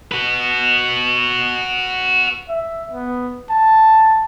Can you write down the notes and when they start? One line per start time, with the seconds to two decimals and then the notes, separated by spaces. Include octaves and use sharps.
0.12 F#4 B4
2.49 E5
2.91 B3
3.50 A5